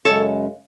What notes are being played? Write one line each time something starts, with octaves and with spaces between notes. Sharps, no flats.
F#2 C#3 G#3 A4 C#5